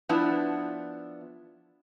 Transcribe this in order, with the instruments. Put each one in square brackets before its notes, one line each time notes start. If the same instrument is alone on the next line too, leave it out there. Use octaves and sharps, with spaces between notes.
[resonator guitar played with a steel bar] F3 B3 D4 E4